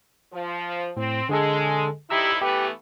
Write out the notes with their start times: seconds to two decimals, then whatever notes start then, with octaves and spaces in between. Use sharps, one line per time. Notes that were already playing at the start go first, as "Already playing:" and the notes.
0.32 F3
0.97 A2 C4
1.29 D3 G#3 G#4 A4
2.10 D2 D#4 E4 G4 A#5 E6
2.42 E3 A3 B3 G4